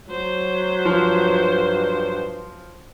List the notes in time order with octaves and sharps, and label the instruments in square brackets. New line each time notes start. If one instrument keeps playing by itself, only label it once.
[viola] F#3 [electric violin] C5
[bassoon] G2 [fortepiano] F3